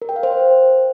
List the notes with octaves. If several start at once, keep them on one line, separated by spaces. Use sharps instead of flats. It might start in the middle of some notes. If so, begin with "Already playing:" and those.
A#4
G5
F5
C5